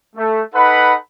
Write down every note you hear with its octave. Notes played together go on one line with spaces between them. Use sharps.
A3
D#4 A4 B4 F#5 B5